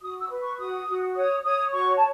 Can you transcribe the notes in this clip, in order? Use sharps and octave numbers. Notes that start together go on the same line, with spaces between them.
F#4 D#6
E6
B4
C#6
F#4 D#6
F#4
C#5 D#6
C#5 D#6
F#4 C#6
A5